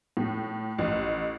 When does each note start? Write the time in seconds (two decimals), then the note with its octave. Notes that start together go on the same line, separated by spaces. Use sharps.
0.17 A2
0.78 A1